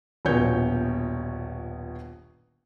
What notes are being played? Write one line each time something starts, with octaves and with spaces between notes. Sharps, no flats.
D#1 A#1 B2 C#4 C#5 G6